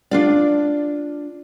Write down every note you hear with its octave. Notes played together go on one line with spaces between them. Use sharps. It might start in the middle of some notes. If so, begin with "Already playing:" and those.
D4 F4 D5